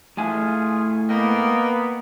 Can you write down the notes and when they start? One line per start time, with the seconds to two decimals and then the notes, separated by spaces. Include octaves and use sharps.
0.17 A2 A3 F4 G#4 G#5
1.09 A#3 B3 D#5 G5